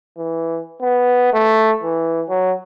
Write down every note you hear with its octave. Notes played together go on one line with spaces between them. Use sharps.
E3
B3
A3
E3
F#3